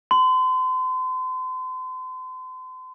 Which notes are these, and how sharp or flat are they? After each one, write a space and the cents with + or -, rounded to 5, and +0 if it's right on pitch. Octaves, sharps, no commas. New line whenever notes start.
C6 -40